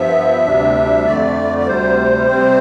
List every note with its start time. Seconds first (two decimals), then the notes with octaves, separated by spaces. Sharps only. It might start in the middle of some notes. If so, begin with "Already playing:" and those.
Already playing: G2 F3 B3 E5
0.45 D2 C3 G3 D4
1.06 F2 D3 A3 D5
1.58 D5
1.66 D2 C3 G3 C5
2.28 C3 G3 C4